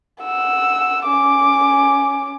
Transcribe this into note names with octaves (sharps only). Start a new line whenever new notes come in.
F#5 E6
C#4 D6